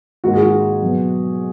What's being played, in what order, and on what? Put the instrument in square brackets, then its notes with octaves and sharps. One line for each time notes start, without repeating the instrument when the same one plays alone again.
[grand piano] G#2 D#3 A#3 [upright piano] F#4
[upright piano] G#4
F#4
[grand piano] B2 F#3 B3